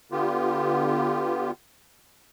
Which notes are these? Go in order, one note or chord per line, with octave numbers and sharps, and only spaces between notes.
D3 B3 F4 G4